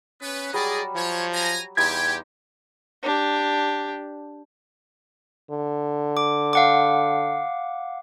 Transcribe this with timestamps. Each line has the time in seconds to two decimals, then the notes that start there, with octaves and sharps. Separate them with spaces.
0.21 B3 C#4 B4
0.53 F#3 G3 G#4 D5 D#5
0.96 F3 C#5
1.33 G#5 A#5
1.77 E2 G3 D#4 G4 C6 G#6
3.03 D4 G4
5.51 D3
6.17 D6
6.53 F5 F#5 D6